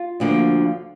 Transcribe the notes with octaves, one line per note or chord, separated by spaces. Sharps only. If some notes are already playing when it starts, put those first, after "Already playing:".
Already playing: F4
D2 D3 F3 A#3